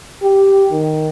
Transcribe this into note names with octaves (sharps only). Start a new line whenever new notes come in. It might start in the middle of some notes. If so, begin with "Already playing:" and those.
G4
D#3